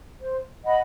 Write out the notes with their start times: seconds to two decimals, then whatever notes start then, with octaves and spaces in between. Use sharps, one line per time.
0.20 C5
0.64 D#5 F#5 B5